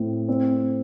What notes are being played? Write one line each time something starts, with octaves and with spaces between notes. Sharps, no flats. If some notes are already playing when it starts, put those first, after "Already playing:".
Already playing: A2 C4
C4